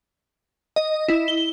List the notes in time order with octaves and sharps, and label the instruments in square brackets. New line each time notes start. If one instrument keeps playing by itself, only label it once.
[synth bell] D#5
E4
G7